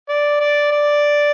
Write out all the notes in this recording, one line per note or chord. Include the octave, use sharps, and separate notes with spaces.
D5
D5
D5